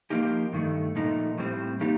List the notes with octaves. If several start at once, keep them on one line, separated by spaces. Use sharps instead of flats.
F3 A#3 D#4 G4
G2 D#3 A3
A#2 F3 A3 D#4
A2 G3 C4
F3 A#3 D#4 G4